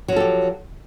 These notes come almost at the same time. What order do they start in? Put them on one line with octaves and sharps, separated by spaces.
F#3 F3 A4 G4